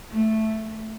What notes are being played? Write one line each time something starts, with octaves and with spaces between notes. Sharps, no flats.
A3